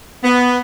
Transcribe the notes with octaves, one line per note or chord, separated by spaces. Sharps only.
B3